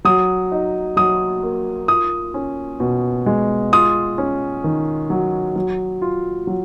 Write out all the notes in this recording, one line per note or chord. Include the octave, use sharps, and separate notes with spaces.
F#3 D#6
D#4
F#3 D#6
A#3
F4 D#6
C#4
B2
G#3
F4 D#6
C#4
D#3
F#3
F#3
F4
F#3